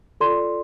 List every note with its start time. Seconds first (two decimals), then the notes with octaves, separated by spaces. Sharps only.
0.21 F4 A4 D5 C6